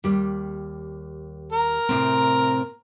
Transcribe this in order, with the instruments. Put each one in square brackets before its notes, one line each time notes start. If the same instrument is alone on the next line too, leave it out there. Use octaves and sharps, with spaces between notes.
[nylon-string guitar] D#2 G3
[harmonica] A#4
[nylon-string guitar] A2 C3 C4